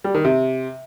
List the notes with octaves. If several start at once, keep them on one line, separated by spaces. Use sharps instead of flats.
G3
D#3
C3